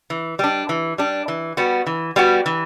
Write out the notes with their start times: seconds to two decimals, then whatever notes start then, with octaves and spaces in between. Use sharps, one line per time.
0.10 E3
0.39 G3 D4
0.69 E3
0.98 G3 D4
1.28 E3
1.57 G3 B3 F#4
1.87 E3
2.16 G3 B3 F#4
2.46 E3